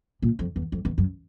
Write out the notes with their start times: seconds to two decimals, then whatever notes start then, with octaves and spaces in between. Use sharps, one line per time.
0.22 A#2
0.39 F2
0.56 E2
0.72 F2
0.85 E2
0.98 F#2